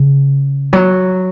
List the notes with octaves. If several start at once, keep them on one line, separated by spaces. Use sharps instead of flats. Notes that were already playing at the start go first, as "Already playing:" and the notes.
Already playing: C#3
F#3